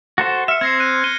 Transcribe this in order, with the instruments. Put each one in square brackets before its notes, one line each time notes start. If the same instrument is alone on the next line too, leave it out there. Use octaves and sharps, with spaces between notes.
[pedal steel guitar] F#4 A4 C5
[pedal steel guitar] E5 [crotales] F6 C#7
[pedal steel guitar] C4 [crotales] G#6 A#6 C7
[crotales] F#6 D#7
G#6 D#7 G7